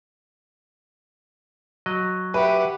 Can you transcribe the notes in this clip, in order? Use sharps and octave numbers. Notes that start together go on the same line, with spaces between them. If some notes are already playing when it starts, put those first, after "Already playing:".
F#3 D#5
G4 B4 E5 F#5